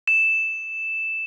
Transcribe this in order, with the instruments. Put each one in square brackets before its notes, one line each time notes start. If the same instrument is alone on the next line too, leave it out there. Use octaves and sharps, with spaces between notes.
[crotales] E7